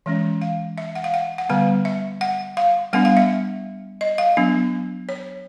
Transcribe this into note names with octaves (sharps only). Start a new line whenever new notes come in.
E3 G#3 C#4
F5
E5
F#5
F5
F#5
F#5
D3 G3 B3 F5
E5
F#5
F5
G3 B3 D4 F#5
F5
E5
D#5
F5
F#3 B3 D4
C#5